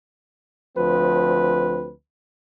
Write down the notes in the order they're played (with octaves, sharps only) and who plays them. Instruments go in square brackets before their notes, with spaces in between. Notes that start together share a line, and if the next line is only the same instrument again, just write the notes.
[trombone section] D2 F3 C4 B4